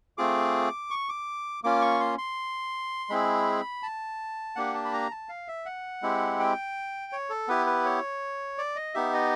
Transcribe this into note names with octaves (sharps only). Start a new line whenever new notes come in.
A3 C4 F4 G#4 D6
C#6
D6
A#3 C#4 F4 D6
C#6
C6
C6
G#3 C4 E4 G#4 B5
A5
A#3 D4 G4 F#5
A5
B5
A#5
A5
F5
E5
F#5
G#3 C4 E4 G4
G5
C#5
A4
B3 E4 G4 B4
B4
C#5
D5
D#5
B3 D#4 G4 E5
D#5